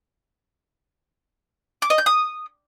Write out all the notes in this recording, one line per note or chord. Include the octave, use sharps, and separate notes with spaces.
D6
D#5
G6
D#6